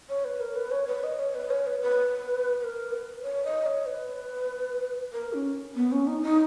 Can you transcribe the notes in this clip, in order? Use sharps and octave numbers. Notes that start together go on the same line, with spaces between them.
C#5
B4
A#4
B4
C#5
B4
D#5
C#5
B4
C#5
B4
B4
B4
A#4
B4
C#5
D#5
C#5
B4
A#4
C#4
B3
C#4
D#4
D#4